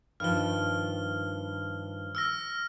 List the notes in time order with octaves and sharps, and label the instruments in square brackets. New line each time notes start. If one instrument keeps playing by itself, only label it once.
[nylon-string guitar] G2 D#3 F3 [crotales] F6 G7
[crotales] E6 F6 A#6